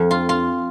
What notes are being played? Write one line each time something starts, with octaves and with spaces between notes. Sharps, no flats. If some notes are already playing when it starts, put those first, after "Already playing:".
Already playing: F2
F4
F4